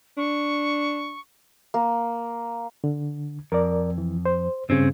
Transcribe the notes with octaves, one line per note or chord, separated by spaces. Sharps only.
D4 C#6
A#3
D3
F2 A#4 D5
E3
C5
G2 C#3 C4 C#4